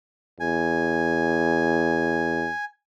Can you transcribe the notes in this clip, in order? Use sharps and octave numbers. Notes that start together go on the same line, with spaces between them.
E2 G#5